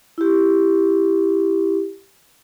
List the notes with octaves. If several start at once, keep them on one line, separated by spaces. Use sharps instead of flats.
E4 G4